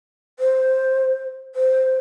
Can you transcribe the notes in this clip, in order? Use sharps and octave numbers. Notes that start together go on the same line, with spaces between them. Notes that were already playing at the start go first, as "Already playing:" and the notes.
C5
C5